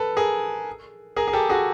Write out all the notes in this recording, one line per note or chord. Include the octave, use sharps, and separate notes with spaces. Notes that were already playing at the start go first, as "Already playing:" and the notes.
Already playing: A4 B4
G#4 A#4
G#4 A#4
G#4
G4 A4
F#4 G#4